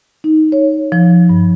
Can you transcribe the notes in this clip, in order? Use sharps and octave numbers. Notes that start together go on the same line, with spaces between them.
D#4
C#5
F3
G2